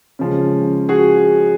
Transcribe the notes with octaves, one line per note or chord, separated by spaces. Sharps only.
C#3 F3 G#3
F#4 G#4